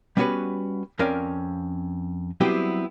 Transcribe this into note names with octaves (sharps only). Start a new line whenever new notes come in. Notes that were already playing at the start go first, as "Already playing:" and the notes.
G3 B3 C#4 F#4 B4 F#5
F2 C4 C#4 A#4 D5 F5
F#3 G3 B3 C4 E4 G4